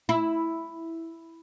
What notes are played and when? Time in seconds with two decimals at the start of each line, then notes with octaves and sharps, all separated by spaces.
0.09 E4